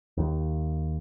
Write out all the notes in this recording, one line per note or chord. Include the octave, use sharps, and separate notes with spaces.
D#2